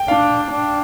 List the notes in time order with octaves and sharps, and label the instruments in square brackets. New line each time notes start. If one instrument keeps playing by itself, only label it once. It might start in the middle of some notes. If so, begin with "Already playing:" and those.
Already playing: [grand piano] G5
[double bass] D4 [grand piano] F5
[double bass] D4